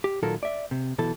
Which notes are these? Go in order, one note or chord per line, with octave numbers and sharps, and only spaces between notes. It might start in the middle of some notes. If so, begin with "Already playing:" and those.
G4
A#2 D#3 F#3 F4 A4 A#4
D5 E5
C3
B1 B2 E3 A4